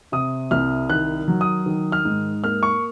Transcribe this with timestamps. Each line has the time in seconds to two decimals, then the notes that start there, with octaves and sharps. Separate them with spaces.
0.12 C3 D#6
0.51 C2 F6
0.90 D#3 F#6
1.28 F#3
1.41 D#6
1.66 D#3
1.92 F6
2.05 G#2
2.44 A#3 F6
2.63 C#6